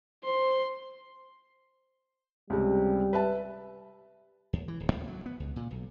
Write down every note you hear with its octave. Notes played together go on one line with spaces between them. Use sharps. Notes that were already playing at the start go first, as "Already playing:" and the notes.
C5 C6
C#2 C3 G3
B4 E5 A5
D#2
E3
D1
D#2
F#3
B3
C#2
A#2
B1